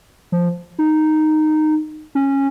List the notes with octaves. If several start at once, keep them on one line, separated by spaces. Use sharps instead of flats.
F3
D#4
C#4